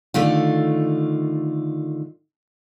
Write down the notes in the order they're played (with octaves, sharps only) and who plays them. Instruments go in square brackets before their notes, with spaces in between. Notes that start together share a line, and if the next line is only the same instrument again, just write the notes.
[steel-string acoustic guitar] D3 D#3 A3 F4